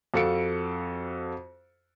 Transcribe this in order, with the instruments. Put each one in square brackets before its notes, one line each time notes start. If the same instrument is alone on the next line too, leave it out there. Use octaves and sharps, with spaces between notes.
[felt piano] F2 F#4 A4 F5 C#7 D7